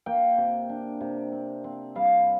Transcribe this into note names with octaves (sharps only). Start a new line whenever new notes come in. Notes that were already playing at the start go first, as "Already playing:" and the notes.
A#3 G5
C3
D4
C3
C4
C4
G3 F5